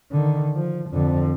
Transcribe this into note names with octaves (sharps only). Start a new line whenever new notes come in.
D3 D#3
F3
F2 D3